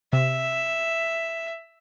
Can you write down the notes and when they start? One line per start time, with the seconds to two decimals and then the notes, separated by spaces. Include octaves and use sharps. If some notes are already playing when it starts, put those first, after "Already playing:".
0.13 C3 E5